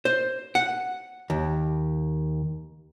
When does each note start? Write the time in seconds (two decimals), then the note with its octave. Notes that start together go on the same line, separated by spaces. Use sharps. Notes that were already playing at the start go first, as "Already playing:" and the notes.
0.05 C5
0.55 F#5
1.30 D#2